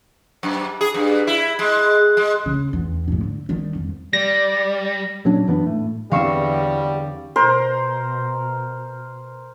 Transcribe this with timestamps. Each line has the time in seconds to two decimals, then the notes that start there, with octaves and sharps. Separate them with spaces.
0.43 F#2
0.81 G#4
0.94 G2
1.27 E4
1.59 G#3
2.17 G#3
2.46 C#3
2.73 E2
3.08 A#1 G#2
3.23 D3
3.49 D#3 G3
3.75 F2
4.13 G3 D5 A#6
5.25 A#2 F#3 C#4 D4
5.47 F#2 E3 B3 D4
5.65 A2 A3
6.11 E2 D3 G3 C4 F5 C#6 E6
7.36 B2 A#4 C5 C6